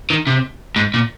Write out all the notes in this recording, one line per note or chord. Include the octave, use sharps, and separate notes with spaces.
D#3
C3
G#2
A#2